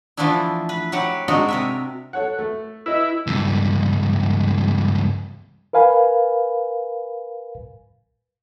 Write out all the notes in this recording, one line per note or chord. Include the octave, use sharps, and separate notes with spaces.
E3 F3 A3 B3 D4 E4
B4
F#3 G4 B4 F#5
G#3 C4 D4 D#4 F#4 A#4
C3 A#4 E5
A4 C#5 F#5
A3
E4 B4 D#5
C#2 G2
A#4 B4 F5 G#5 B5